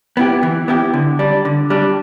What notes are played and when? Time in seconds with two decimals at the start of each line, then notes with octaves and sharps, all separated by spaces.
0.17 B3 E4 G4
0.43 E3
0.68 B3 E4 G4
0.94 D3
1.19 G3 D4
1.45 D3
1.70 G3 D4